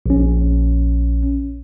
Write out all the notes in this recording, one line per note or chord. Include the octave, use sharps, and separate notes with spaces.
A#1 C#4